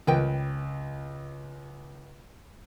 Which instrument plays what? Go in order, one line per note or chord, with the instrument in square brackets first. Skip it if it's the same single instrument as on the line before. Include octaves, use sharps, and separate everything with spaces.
[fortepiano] C#2 [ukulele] A#4 B4 G5